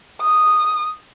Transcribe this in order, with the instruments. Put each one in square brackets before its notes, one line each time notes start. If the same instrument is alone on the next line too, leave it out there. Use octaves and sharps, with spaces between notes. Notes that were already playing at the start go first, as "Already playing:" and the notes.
[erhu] D#6